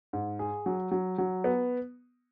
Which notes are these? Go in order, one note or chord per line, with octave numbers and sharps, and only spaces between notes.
G#2
G#4
F#3
F#3
F#3
B3